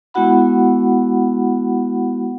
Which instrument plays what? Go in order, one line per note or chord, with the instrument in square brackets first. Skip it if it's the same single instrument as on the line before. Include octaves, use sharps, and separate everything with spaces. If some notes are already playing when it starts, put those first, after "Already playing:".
[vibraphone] G#3 B3 E4 F#4 F#5 B5